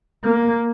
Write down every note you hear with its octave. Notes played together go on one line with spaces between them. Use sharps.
A#3